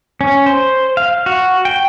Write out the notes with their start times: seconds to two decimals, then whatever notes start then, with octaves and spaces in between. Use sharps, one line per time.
0.21 C#4
0.46 C5
0.97 F5
1.26 F#4
1.65 G5